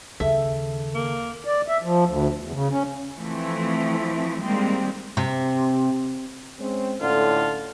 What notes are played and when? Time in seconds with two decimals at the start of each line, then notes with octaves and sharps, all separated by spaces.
0.20 D#2 C#3 A4 E5
0.95 A#3
1.45 D5
1.68 E5
1.83 F3
2.05 D2
2.40 E2
2.52 C#3
2.71 C#4
3.17 E3 F3 A3 C4 E4
4.40 D#3 G3 G#3 A#3 C4
5.17 C3
6.58 G#3 C4 C#4
7.01 A2 D3 C#4 F4